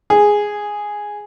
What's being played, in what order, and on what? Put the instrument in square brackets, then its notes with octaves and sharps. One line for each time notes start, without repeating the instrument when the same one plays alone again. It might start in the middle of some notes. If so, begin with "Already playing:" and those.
[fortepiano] G#4